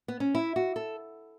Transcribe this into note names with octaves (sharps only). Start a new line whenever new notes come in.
B3
C#4
E4
F#4
A4